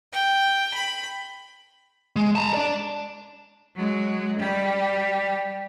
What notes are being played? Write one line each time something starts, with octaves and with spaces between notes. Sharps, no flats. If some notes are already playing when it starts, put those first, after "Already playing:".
G5
B5
G#3
A5 A#5
D5 A5
F#3 G#3
G3 G4